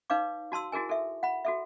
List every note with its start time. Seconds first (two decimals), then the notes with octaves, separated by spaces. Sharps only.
0.10 D#4 B4 C#5 F5 D6
0.52 F#4 A5 C6 E6
0.72 E4 F#4 G#4 A#4 G#5
0.89 A4 E5
1.23 F#5 B5
1.45 F#4 A4 E5